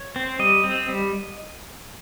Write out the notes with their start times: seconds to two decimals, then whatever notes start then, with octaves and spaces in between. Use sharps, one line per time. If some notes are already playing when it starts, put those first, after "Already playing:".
Already playing: C#5
0.16 C4
0.39 G3 D#5
0.64 C4
0.89 G3